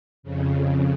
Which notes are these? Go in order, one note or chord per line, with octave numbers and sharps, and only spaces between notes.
F2 C#3